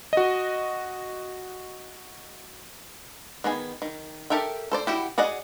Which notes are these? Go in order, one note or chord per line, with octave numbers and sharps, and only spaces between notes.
F#4 D#5
D#3 B3 G#4 G#5
D#3
G4 A4 A#4 E5 G5
A4 C5 D5
E4 F#4 G4
F#4 G#4 D5 D#5 F#5